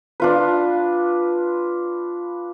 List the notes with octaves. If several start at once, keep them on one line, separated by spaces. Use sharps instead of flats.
D4 F4 B4